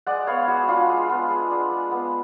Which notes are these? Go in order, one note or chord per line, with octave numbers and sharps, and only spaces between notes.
G#3 D5 F#5
B3 C#5 F5
G#3 F#4
D4 F4
G#3
B3
G#3
D4
G#3
B3